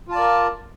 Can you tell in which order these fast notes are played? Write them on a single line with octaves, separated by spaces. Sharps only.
F4 A5 D5 A#4